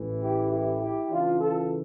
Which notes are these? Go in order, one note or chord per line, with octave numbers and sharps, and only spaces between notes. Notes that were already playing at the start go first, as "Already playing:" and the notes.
Already playing: A1 A2 E3
E4 G4
E4 G4
E4 G4
C#2 C#3 E3 D4 F4
F4 A4